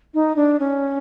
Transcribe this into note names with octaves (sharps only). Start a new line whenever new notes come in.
D#4
D4
C#4